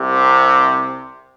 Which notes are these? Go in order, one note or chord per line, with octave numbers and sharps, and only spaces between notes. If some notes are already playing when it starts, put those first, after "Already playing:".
Already playing: C2 C3